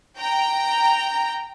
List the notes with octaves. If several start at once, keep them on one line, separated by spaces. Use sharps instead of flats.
G5 A#5